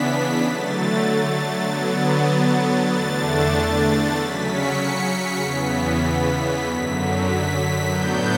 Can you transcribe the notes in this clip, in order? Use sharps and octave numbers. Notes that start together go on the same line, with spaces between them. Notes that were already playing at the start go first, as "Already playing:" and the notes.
Already playing: C#3 E3 B3 D4 B6
D3 F#3 A3 A6
D3 F#3 B3
E2 D3 A3 D4 A6
C#3 F#3 C#4 B6
C#7
B6
E2 C#3 E3 B3
F#2 D3 F#3
B6
A2 F#3 B3 D4 G6